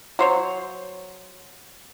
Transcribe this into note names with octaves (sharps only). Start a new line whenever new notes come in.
F#3 C5 C#5